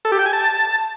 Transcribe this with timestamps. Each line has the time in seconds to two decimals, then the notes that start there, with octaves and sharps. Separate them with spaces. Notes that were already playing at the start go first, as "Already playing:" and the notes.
0.05 A4
0.12 G4
0.19 G5
0.26 G#5
0.33 A5